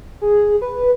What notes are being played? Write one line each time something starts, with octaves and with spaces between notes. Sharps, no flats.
G#4
B4